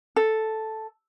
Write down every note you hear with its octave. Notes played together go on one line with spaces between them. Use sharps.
A4